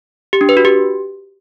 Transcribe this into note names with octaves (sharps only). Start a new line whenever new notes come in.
G4
D4
B4
F#4
G4